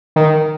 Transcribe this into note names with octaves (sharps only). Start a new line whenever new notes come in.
D#3